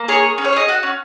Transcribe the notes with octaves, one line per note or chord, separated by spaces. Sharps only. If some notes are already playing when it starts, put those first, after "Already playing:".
Already playing: A#3
G#4 C#5
G#4
C#4
C#5
G#4 D#5
F#4 F#5
C#4